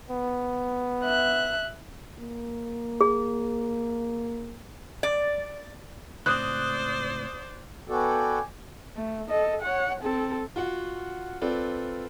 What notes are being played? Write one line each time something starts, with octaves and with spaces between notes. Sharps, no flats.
B3
E5 F#6
A#3
G#4
D5
C#2 A2 C4 C5 D5 D#6 F#6
B3 F#4 A4 D5 G5 G#5
A3
A4 D#5
C#5 F#5
C4 A4
F4 F#4 F#5
C4 F4 A4 B4 D5